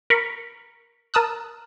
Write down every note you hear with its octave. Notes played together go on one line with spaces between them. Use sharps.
A#4 B5 C#6
A#4 A5 D#6 E6 F#6